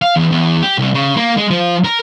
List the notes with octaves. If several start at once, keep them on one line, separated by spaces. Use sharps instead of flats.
F5
E2
E2
G4
C2
C#3
A#3
G#3
F3
A#4